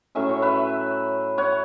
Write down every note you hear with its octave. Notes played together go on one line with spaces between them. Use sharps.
A2 F#3 C#4 E5
C#5
B4 E5
C#5 F#5